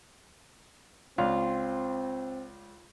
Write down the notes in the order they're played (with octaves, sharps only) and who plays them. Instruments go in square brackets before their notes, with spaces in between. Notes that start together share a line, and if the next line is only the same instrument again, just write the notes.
[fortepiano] C#2 D4 [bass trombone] C4 [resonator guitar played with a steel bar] F4